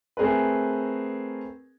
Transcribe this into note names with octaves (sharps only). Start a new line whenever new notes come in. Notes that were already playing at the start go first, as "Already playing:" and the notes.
A3 C4 G#4 A#4 B4